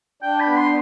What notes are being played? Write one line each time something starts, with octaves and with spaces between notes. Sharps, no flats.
D4 G5
B5
B3
C6